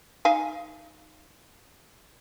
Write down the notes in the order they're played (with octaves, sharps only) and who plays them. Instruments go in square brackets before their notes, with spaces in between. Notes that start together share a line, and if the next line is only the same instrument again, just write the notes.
[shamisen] D#4 F5 G#5